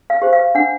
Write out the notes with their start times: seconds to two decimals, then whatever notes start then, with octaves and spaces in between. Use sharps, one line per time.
0.10 F5
0.22 G4 C5
0.33 F5
0.55 D4 F#5